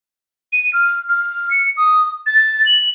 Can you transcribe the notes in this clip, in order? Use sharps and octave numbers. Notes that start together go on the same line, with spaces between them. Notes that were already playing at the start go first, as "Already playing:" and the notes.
D#7
F6
F6
C#7
D#6
A6
F#7